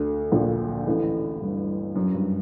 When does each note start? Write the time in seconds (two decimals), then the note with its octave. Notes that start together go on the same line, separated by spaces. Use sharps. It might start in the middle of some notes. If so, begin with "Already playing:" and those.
Already playing: D2 D3
0.32 A#1 A#2
0.86 A1 A2
1.42 G2
1.95 F#2
2.14 G2